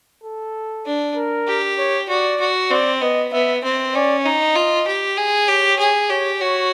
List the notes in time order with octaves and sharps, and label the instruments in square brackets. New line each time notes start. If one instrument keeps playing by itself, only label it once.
[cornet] A4
[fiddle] D4
[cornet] A#4
[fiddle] G4
[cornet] C#5
[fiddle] F#4 [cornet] D5
[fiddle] F#4
[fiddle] C4 [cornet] D5
[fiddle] B3 [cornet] D#5
[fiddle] B3 [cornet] E5
[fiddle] C4
[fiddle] C#4 [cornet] D5
[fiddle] D#4 [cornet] D#5
[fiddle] F4
G4
G#4
[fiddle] G4 [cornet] C#5
[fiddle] G#4
[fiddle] G4 [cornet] C#5
[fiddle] F#4 [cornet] C#5